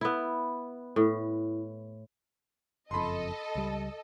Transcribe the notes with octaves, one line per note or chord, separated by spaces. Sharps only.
B3 E4
A2
F#1 F2 A4 D#5 B5 C6
C#2 G3